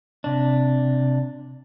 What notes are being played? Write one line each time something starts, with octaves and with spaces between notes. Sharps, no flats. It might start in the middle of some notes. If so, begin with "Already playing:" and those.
C3 D4